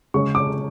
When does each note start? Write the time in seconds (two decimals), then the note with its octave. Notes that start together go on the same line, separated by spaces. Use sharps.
0.14 C#3 G#3 C#4 C#6
0.35 D6